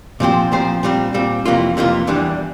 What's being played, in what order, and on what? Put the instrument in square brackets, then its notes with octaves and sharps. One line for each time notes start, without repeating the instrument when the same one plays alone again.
[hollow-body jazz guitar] A#2 F3 C4 G4 C5
A#2 F3 C4 G4 C5
A#2 G3 C4
A#2 G3 C4
F2 C3 E3 A#3 F4
F2 C3 E3 A#3 F4
E2 E3 G3 D4